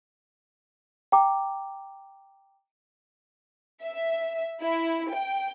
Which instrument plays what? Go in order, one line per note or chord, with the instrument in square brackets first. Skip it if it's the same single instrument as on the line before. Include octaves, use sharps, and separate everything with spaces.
[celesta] G5 A#5 D6
[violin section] E5
E4
G5